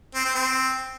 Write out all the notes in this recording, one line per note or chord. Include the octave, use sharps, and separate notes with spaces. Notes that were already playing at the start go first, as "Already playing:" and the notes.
C4
C4
C4